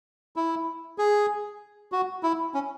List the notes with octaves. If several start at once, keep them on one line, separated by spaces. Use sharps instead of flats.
E4
G#4
F#4
E4
C#4